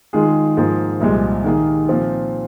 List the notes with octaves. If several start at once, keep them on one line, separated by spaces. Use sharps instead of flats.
D#3 G#3 F4 G#4
G#2 F3 A#3 G#4
C2 A#2 F3 G#3
D#3 A#3 G#4
A#2 F3 C4